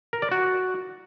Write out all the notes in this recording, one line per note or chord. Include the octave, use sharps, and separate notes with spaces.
A#4
D5
F#4